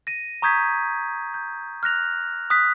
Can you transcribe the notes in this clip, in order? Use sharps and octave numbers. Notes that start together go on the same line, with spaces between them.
A#6 D#7
A#5 C#6 D#6 G6 G#6 B6
G6
F6 F#6 A#6 F7
D#6 F#6 B6